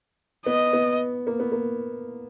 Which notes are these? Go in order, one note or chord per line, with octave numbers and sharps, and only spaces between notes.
B3 D#5
B3
A#3
B3
A#3